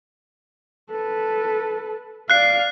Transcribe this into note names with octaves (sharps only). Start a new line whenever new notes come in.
A4 B4
D5 F5 F#6 C7